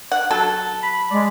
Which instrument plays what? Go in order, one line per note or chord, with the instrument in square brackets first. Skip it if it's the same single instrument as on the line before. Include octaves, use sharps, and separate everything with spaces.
[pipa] F#5
F#3 A4
[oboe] B5
[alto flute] G#3 [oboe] D5